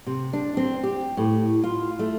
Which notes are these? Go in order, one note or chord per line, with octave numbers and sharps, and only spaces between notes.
C3
D4
C4
G4
A2
F4
A3